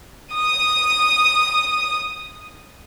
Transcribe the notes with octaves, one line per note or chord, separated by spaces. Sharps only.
D#6 D#7